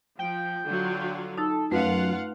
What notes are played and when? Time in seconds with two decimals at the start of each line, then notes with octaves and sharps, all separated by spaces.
0.19 F3 G5
0.64 D3 F#3 F4
1.38 D#4 A4
1.72 F#2 A3 F4 B4 F5 F#5